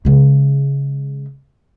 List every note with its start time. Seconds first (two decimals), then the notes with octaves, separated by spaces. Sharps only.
0.05 C#3 G#3